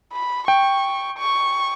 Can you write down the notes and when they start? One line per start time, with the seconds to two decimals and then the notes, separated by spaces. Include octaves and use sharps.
0.13 B5
0.48 G5 C#6
1.18 C#6